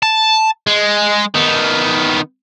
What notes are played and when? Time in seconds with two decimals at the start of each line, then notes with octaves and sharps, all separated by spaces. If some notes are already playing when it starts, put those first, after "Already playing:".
0.03 A5
0.67 G#3
1.35 D#3 B3